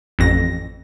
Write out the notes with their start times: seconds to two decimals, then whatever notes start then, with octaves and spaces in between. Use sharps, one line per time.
0.19 A1 F2 A#6